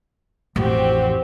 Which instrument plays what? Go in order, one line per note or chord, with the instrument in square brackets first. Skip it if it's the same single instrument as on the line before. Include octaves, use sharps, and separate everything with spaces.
[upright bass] A1 F2 [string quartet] C4 F#4 G4